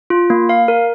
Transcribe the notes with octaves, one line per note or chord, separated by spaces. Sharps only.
F4
A#3
F5
A#4